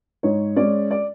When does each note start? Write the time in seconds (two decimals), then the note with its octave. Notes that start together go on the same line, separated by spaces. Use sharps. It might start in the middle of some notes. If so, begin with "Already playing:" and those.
0.23 G#2 C#5
0.56 G#3 C#4 D5
0.91 D5